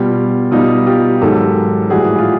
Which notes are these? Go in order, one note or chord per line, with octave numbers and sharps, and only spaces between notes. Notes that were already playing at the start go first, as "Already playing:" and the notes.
Already playing: B2 G3 F4
B2 G3 D#4 F4
F4 G4
G#2 D#3 F#3 G4 A4
A2 E3 G3 F#4 G#4
F4